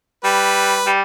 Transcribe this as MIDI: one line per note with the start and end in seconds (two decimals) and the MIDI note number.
0.24 0.78 55
0.24 0.89 71
0.86 1.02 55